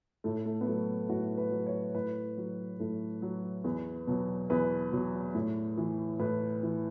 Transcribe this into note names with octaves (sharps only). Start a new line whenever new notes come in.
A2 A3
A3
B3
F#3 A3
A2 F#4
B4
F#3
C#5
A2 B4
F#3
A2 A4
F#3
E2 B4
B2 F#3
E2 B4
B2 F#3
A2
E3
A2 B4
E3